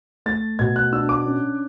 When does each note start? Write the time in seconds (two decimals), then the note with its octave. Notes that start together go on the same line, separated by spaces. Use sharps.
0.26 A3 A6
0.59 B2 G#6
0.76 F#6
0.92 D4 E6
1.09 D6
1.26 C#4